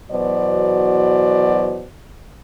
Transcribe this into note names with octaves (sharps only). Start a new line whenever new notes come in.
E2 B2 F#3 C5 D5